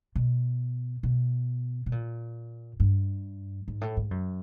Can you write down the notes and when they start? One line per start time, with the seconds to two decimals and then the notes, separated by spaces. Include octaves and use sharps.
0.16 B2
1.03 B2
1.86 B2
1.92 A#2
2.80 G2
3.68 G#2
3.81 A2
3.97 G#2
4.11 F#2